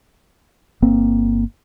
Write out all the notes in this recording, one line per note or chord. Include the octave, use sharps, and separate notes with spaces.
G1 A#3 C4